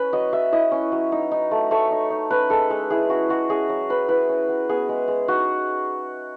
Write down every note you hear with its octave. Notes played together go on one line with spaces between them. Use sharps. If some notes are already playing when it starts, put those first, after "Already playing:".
Already playing: C#4 B4
F#3 D#5
F#3 E5
E4 D#5
C#4
F#3
D#4
D#4
A3
A3 C#5
D#4
D#4
C#4 B4
G#3 A4
G#3 B4
E4 G#4
C#4 F#4
G#3 F#4
C#4 G#4
F#3
F#3 B4
E4 B4
C#4
F#3
B3 G#4
G#3
G#3
D#4 F#4